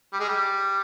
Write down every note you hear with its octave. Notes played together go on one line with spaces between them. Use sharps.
G3
G#3
G3